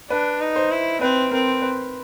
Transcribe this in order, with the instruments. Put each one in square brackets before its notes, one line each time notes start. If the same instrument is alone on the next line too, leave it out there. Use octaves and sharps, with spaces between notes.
[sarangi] D4 [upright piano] B4
[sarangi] D#4
[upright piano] C5
[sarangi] E4
[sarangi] C4 [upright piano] B4
[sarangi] C4 [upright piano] A#4
[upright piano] B4